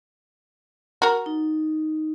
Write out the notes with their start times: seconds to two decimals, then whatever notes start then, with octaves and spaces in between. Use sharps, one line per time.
1.02 F#4 A#4
1.26 D#4